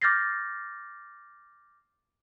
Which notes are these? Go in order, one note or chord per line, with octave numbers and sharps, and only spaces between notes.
D6 F6 G6 A6 A#6 C7